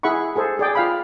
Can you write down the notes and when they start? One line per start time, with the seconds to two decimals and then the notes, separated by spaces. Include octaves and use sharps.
0.03 E4 G#4 E5 F#5 B5 C#6
0.36 G#4 A4 C5
0.59 G#4 D5 G5
0.75 F4 F5 B5